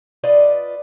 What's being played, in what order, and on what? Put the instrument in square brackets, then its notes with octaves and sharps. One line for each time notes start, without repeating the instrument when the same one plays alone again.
[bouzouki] F4 B4 D5 D#5